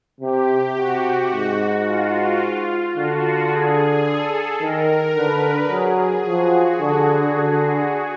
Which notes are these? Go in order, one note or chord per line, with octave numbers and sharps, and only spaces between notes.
C3 G4
C3 F#4
G#2
F4
D3 F#4
G#4
A4
D#3 A#4
D3 B4
F#3 G#4
F3 F#4
D3
D3